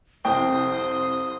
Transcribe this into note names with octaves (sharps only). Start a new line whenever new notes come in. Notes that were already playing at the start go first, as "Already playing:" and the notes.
C2 F2 C5 G5 D#6